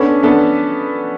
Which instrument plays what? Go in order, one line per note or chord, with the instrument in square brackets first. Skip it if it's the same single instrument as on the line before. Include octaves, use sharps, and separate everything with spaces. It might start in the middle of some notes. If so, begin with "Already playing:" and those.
Already playing: [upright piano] B3 D4 A4 [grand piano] C#4
[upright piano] B3 D4 A4